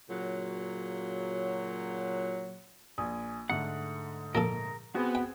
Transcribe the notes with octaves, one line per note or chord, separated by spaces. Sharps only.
A#2 C#3 F#3
A#1 G#5 D#6
G#2 D3 A3 F#5
A#2 F3 A4 A#4
B3 C4 F#4 G#4
G5